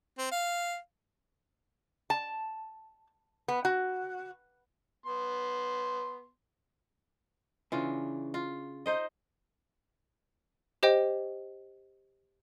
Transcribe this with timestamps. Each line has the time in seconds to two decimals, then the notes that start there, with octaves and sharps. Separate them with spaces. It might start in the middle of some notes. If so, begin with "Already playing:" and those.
0.18 C4
0.32 F5
2.10 A5
3.48 B3
3.65 F#4
5.06 B3 C6
7.72 C#3 E3 D4 F4
8.34 F4
8.86 D#4 C5 D#5
10.83 G4 C5 D#5 G5